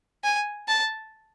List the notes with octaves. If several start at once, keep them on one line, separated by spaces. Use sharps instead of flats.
G#5
A5